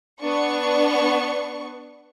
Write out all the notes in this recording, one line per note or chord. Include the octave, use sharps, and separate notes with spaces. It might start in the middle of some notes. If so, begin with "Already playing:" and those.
B3 D4 C#6